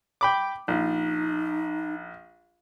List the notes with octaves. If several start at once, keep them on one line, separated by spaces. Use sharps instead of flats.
G5 B5 D6
A#1 D#4